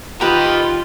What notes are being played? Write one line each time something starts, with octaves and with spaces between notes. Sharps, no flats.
F4 G4 A#4 B4 D#5 G5